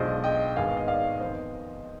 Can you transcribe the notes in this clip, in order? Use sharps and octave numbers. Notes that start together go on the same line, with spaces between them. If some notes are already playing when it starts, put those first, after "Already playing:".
Already playing: B1 B2 G#3 D4 F4 C5 D#5
D#5 G5
G#1 G#2 D#3 B3 F5 G#5
D#5
D5 F5
F2 D#3 B3 D#4 C5 D#5